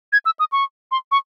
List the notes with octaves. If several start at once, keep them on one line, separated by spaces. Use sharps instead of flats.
G#6
E6
D#6
C#6
C6
C#6